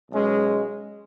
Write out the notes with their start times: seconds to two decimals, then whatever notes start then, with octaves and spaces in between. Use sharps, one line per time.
0.10 B1 B2 G#3 C#4